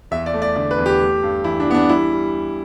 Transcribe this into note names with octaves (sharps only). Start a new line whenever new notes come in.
E2 E5
D5
A3
D5
D3 D5
B4
E2
G4
A3
G2
E3 E4
D4
E3 B3
D4
G3 E4
G3